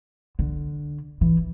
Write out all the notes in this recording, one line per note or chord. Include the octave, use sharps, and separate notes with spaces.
D3
E3